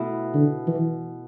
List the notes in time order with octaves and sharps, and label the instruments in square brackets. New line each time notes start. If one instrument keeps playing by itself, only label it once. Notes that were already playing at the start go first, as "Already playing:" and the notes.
Already playing: [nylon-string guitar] B2 A3 E4
[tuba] D3
E3